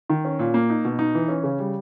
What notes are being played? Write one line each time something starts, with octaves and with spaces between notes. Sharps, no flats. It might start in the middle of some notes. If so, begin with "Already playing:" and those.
D#3
C#4
A#2
A#3
D#4
B2
D#4
E3
C#4
C#3
G3